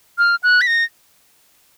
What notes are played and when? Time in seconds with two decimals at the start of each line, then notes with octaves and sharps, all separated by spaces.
0.18 F6
0.43 F#6
0.61 B6
0.67 A#6